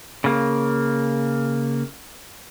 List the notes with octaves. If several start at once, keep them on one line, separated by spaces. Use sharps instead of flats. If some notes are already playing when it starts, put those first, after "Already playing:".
C#3 A#3